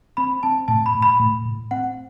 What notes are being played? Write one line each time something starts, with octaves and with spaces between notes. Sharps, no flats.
C4 B5
C4 A5
A2 A5
B5
A2
B5
A2
A2
C4 F#5